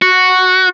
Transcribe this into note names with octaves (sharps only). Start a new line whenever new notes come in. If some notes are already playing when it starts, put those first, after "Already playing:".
F#4